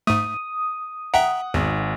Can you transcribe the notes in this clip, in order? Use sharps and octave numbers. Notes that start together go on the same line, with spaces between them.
G#2 A3 D#6
E5 F#5 G5 A#5
G#1 E2